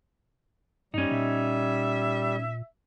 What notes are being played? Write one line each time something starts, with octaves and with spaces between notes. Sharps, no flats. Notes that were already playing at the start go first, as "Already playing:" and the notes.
G2 G3 C#4 D#4
A#2 E5